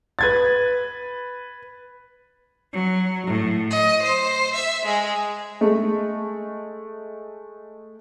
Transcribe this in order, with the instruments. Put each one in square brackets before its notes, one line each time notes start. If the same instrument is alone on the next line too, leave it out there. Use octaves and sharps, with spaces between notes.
[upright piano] B4 G#6 A6
[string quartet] F#3
A2
D#5
C5
E5
G#3
[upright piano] G#3 A3